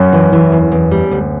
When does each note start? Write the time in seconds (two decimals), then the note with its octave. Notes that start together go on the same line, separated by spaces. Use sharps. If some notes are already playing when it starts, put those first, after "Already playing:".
Already playing: F#2
0.13 E3
0.32 E3
0.52 E2
0.72 E2
0.91 G3
1.11 D2